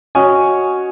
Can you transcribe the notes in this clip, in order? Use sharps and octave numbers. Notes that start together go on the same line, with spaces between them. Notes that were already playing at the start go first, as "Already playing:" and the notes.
C#4 F#4 D#5 G#5